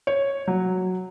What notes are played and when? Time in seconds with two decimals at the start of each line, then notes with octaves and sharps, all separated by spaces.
0.07 C#5
0.48 F#3